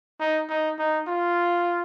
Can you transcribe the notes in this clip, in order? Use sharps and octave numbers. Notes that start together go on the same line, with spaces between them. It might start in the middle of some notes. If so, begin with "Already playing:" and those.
D#4
D#4
D#4
F4